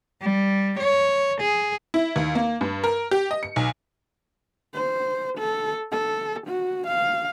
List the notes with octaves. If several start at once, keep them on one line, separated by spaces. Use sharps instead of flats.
G3
C#5
G#4
E4
D#2
A#3
G2
A#4
G4
D#5
C#7
B1
C5
A4
A4
F#4
F5